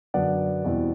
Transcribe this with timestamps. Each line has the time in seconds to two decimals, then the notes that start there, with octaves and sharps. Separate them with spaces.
0.14 F#2 D3 F#3 B3 D4 D5 F#5
0.64 E2 B2 G3 C4 E4